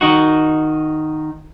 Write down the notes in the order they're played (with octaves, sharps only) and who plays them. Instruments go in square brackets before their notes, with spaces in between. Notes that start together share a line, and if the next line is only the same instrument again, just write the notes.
[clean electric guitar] D#3 D#4 F#4